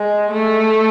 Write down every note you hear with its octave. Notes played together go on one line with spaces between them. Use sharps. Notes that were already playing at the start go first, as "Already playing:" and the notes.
Already playing: G#3
A3